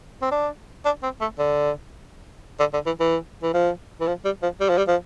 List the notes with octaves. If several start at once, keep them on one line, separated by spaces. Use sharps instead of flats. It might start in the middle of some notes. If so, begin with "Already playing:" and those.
C4
D4
D4
C4
A3
D3
D3
D3
E3
E3
E3
F3
E3
F3
G3
F3
G3
F3
G3
F3